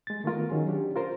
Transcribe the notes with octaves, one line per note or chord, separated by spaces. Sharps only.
G#3 A6
D#3 A3 B3 F4 A#4
D#3 F#3 C#4 G#4
C#4 D4 G4
F4 A#4 C5